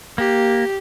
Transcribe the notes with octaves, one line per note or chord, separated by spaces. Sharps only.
A#3 G4